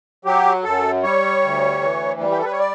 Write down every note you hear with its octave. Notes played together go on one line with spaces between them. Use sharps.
F#3 G4
F#2 A4
G3 C#5
D2
E3
G3
G4
A4
B4
C#5
D5